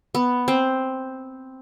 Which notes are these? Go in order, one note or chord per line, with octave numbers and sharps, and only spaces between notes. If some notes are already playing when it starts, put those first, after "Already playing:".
B3
C4